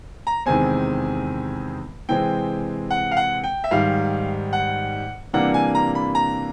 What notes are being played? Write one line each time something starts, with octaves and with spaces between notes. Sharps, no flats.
A#5
E2 C3 D#3 G#3 C4 G#5
C3 E3 G#3 C4 G5
F#5
F5
F#5
G5
E5
G#2 D#3 G3 F5
F#5
C3 E3 G3 A#3 D4 F#5
G#5
A#5
B5
A#5